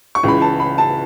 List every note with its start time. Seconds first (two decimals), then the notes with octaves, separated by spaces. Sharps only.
0.15 C#6
0.23 C#2 C#3 E3 B5
0.42 A5
0.60 B5
0.78 A5